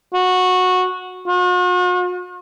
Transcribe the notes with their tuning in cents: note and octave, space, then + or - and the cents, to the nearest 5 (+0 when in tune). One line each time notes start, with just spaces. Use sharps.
F#4 -15
F#4 -45